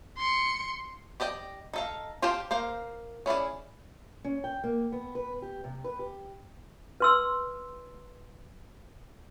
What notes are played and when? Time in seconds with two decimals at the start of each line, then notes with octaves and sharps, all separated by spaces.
0.18 C6 C#7
1.20 G4 D5 D#5 G5
1.73 D#4 A4 F5
2.22 F4 G4 C5 F5 A5
2.51 A#3 C5 F5
3.26 C#4 E4 G#4 D5
4.24 C#4
4.44 G5
4.64 A#3
4.92 B3
5.15 B4
5.42 G4
5.64 C3
5.84 B4
5.99 G4
7.00 B4 C6 E6